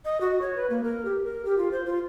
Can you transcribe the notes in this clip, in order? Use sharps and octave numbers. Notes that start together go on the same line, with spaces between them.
D#5
F#4
C#5
B4
A#3
A#4
G4
A#4
G4
F4
C5
F4